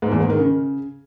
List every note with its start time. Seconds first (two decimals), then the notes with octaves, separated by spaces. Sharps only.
0.02 G#2
0.11 E2
0.21 G#2
0.30 D#3
0.39 C#3